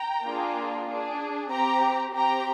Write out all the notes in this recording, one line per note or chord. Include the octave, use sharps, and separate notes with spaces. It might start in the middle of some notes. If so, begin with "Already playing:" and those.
Already playing: G5 A#5
A#3 D4 F4 G#4
D4 G#4
C4 G4 G5 A#5
C4 G4 G5 A#5